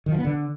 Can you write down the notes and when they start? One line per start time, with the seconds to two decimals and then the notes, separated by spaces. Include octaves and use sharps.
0.06 D#3
0.12 F3
0.18 B3
0.25 D3